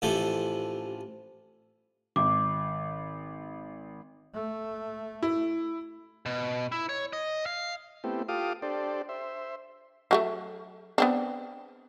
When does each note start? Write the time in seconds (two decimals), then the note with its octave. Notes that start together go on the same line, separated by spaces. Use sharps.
0.02 A1 C3 E3 F3 A4 C5
2.16 G#1 D6
4.34 A3
5.23 E4
6.26 B2
6.72 E4
6.89 C#5
7.13 D#5
7.46 F5
8.04 A3 B3 C4 E4 G4
8.28 F4 G4 A4 F5 D6 D#6
8.62 D4 G4 A4 C5 D5
9.09 C5 E5
10.11 F#3 G#3 A3
10.98 B3 C4 D4